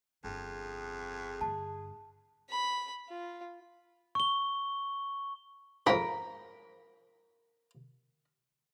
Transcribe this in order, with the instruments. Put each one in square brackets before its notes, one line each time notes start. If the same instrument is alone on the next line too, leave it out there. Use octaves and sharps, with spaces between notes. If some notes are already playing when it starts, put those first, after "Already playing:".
[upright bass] G1 [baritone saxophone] F2 [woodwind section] G#4
[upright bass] G2 D3 [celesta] A5
[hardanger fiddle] B5
F4
[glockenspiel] C#6 G7
[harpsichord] F2 G#2 C#3 [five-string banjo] A#4 B5